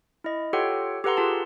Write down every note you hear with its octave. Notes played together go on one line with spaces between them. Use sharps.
E4 D#5
F4 G4 A4 C#5 F#5 G5
G4 A4 B4 F#5 A#5 C6
F4 G#4 A5